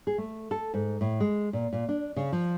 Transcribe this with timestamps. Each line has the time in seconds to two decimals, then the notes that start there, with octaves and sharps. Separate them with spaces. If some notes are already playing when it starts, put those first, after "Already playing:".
0.07 G#4
0.18 A3
0.51 A4
0.74 G#2
1.01 A2
1.20 G#3
1.53 A#2
1.73 A#2
1.89 D4
2.16 C#3
2.32 F3